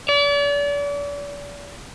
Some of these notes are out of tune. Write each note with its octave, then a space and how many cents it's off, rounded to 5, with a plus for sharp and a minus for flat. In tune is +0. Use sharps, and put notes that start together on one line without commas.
D5 -40